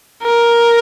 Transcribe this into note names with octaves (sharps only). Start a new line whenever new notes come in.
A#4